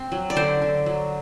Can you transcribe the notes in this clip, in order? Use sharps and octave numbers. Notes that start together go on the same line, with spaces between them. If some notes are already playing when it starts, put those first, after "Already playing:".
Already playing: C4
F#3
D5
D3 C5
D3
F#3